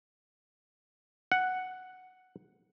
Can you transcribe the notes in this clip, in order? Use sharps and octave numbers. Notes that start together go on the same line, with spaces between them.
F#5